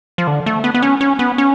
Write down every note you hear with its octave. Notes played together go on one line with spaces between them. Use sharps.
F3
D3
A3
B3
B3
C#4
C#4
B3
C#4